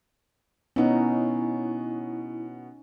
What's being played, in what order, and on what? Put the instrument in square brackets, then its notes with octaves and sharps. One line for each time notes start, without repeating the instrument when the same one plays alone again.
[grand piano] B2 B3 [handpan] C#4 D#4 [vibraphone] E4